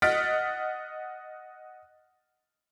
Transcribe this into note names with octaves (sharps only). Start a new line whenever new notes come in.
D#5 F#5 F6 A6 B6 D7